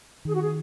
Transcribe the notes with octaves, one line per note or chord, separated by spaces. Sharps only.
D#3 G#4
F#4
G#4